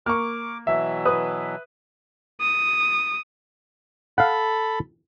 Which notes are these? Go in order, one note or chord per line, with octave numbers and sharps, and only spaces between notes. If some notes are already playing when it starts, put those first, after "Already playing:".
A#3 C#6 D6 F6
B2 E3 F#3 E5
B4 D#6
D#6
A4 F5 F#5 B5